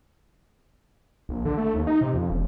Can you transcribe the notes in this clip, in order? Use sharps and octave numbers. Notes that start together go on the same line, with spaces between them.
A#1
D3
A3
D#2
D#4
C3
F2
E1